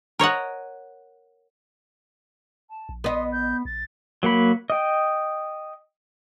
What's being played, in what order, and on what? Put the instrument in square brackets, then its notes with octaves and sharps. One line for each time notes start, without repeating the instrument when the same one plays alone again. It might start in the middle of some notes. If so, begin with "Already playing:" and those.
[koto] A#4 C#5 D#5 F#5
[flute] A5
[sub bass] A#1
[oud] B3 D#5 [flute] C6
[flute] G6
[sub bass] A#1 [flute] A6
[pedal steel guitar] F#3 A#3 F#5 B5
D#5 G5